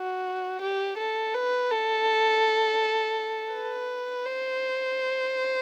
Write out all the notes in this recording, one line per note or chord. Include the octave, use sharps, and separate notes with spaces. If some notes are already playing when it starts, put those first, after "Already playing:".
Already playing: F#4
G4
A4
B4
A4
B4
C5